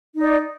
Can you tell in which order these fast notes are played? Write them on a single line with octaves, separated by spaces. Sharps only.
D#4 D#5 D5